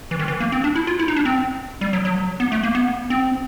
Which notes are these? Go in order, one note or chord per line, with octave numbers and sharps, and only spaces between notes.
E3
D#3
E3
A#3
C4
D4
E4
F4
E4
D#4
D4
C4
G3
F#3
F#3
B3
A3
A#3
B3
C4